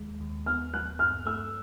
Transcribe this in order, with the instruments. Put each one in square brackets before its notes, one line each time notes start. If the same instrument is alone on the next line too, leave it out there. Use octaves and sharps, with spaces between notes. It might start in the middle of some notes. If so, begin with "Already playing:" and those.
Already playing: [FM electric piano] D#2 G#3
D#2
[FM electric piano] B3 [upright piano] F6
[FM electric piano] F#3 [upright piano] F#6
[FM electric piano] G2 [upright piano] F6
[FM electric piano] A3 [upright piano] E6